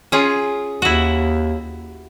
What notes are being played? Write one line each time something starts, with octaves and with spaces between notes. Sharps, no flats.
C#4 F4 G#4
D#2 E4 F#4